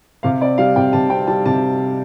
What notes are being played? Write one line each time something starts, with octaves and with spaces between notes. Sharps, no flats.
C3 F5
C4 D5
G3 F5
C3 G5
C3 A5
C4 G5
G3 A5
C3 A5